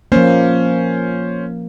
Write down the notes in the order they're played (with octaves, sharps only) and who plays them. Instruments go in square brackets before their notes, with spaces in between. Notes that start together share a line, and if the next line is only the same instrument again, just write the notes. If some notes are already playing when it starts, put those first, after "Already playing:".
[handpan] F3 A#3 [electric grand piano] C#4 C5